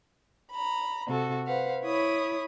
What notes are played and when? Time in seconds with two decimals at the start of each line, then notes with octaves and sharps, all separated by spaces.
0.51 A#5 B5
1.08 C3 F#4 A4
1.47 B4 C5 F5 F#5
1.84 E4 C#5 B5 D#6